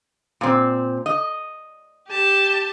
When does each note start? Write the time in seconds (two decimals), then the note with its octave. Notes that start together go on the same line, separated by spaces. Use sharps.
0.41 A#2 C4
1.06 D#5
2.08 G4 A5